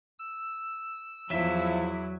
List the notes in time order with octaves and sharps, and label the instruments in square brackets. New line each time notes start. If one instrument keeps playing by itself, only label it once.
[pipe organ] E6
[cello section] E2 E4 [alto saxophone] F3 [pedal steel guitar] F#3 E5